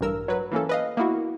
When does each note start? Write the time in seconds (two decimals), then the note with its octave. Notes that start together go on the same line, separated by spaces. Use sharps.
0.01 A1 G2 A#4 E6
0.28 F#3 B4
0.52 E3 A#3 C#4 A4
0.69 B4 D#5 F5
0.97 A#3 B3 E4 F#4